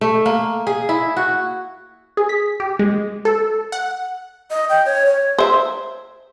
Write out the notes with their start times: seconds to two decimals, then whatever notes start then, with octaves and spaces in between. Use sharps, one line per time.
0.01 A3
0.26 A#3
0.67 G#4
0.89 E4
1.17 F#4
2.17 G#4
2.29 B6
2.60 G4
2.79 G#3
3.25 A4
3.72 F#5
4.51 D#5
4.69 G5
4.86 C#5
5.06 C#5
5.38 C5 E5